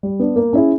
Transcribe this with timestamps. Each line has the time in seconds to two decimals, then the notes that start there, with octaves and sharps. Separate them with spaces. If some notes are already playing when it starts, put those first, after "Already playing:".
0.03 G3
0.19 B3 D4
0.36 A#3
0.53 C#4 E4 G#4